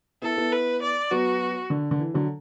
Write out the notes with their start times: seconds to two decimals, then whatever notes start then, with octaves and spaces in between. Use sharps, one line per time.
0.22 B3 E4 A4
0.37 B3 E4
0.52 B4
0.82 D5
1.11 F#3 B3 F#4
1.70 D3
1.91 D3
2.00 E3
2.14 D3 F#3